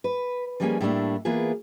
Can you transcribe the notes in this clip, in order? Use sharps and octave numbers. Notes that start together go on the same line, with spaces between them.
B4
F3 G3 G#3 A#3 C#4 G#5
A2 G3 A3 A#3 C#4 D4
E3 A#3 B3 F4 G#4